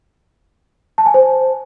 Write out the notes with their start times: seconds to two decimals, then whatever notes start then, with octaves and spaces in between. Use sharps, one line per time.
0.98 A5
1.06 G#5
1.14 C5